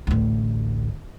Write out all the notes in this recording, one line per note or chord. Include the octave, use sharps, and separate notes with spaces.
A1 D2